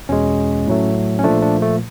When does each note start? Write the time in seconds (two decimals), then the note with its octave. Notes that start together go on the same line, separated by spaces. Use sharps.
0.09 E2 B2 G#3 C#4
0.67 A2 F#3 A3
1.19 C#4
1.24 A#2 F3 A3 D4
1.42 D4
1.62 A3